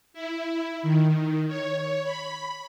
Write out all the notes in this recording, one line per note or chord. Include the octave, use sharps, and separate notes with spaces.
E4
D#3
C#5
B5